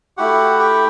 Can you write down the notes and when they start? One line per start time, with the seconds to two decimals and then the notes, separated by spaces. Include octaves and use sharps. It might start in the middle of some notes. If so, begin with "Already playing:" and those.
0.17 A3 E4 F#4 G4 F#5
0.59 G4 G5